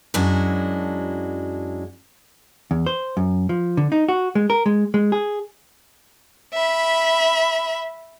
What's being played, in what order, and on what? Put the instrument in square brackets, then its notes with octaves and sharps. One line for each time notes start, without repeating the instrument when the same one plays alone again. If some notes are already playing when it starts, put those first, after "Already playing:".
[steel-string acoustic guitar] F#2 G#3 D4 E4 F#4
[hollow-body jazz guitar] E2
C5
F#2
F3
D3
D#4
F#4
G#3
A#4
G#3
G#3
G#4
[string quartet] E5 B5